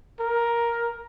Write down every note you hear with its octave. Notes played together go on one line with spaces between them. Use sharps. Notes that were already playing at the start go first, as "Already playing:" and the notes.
A#4